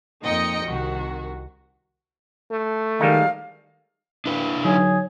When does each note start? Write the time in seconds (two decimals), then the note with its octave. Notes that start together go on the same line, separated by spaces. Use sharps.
0.23 F2 A#2 D#4 D#5 G5 C#7
0.66 C2 D#3 F#4
2.51 A3
3.01 D#3 G3 G#3 D#4 F5
4.26 D4 E4 B4
4.65 D3 F#3 D#4 G#4 C#5